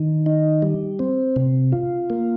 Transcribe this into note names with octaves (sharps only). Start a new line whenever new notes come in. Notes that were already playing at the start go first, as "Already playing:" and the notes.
Already playing: D#3
D#4
G3
C4
C3
F4
A#3